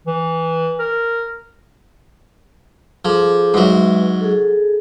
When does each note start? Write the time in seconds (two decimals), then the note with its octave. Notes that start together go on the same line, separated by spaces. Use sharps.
0.07 E3
0.79 A#4
3.05 F3 G#4 A4 D6
3.54 G#2 F#3 G#3 B4 E5
4.21 G#4 A4